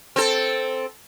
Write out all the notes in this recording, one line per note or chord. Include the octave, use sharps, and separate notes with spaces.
C4 A4